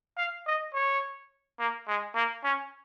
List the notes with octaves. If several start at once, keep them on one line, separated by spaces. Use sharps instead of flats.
F5
D#5
C#5
A#3
G#3
A#3
C#4